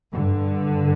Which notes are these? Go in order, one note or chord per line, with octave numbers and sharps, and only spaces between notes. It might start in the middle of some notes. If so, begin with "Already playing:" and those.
G2 D3